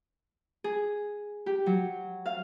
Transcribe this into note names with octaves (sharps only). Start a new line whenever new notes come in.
G#4
G4
F#3
F5